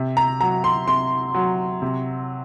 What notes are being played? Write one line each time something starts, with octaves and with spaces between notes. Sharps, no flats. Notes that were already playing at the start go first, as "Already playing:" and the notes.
Already playing: C3
A#5
F#3 A#5
C6
C3 C6
F#3
C3